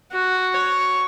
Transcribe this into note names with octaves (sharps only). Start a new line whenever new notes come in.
F#4
C#5